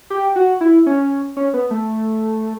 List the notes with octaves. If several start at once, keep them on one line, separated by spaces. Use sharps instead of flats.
G4
F#4
E4
C#4
C#4
B3
A3